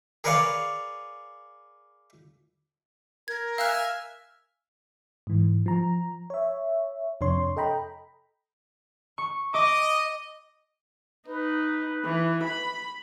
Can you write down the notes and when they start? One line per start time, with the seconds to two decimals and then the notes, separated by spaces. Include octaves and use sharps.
0.24 G#4 A#4 B4 C#5 D5 F5
3.28 A#4 G#6
3.58 E5 F5 G#5 F6 F#6
5.27 G#2 E3
5.66 F3 A#5
6.30 C#5 E5
7.21 F2 C3 D4 C#5 C6
7.57 A4 D#5 G5 A#5 B5
9.18 C#6
9.54 D#5 D6
11.28 D#4 B4
12.04 E3
12.44 B5